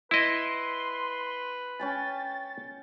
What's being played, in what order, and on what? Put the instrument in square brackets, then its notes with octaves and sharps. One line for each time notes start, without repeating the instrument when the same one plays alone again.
[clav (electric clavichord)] E4 D#5 [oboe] B4 [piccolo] C6
[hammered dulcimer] C#4 G5 G#5 [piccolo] A6